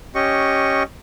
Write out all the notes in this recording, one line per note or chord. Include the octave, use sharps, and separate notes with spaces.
C#4 G4 D#5 C#6